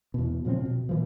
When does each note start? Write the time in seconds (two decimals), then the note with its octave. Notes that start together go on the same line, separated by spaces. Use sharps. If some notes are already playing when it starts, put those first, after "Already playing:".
0.14 E2 B2
0.45 A#2 C#3 F3 C4
0.66 B2
0.89 A#2 E3 F3